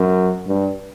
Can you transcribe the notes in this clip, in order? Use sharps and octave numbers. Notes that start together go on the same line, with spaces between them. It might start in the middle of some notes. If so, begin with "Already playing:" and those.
Already playing: F#2
G2